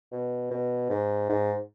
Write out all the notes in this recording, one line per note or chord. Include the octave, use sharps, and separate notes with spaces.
B2
B2
G#2
G#2